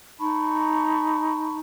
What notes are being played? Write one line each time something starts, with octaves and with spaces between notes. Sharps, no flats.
D#4 A5 B5 C#6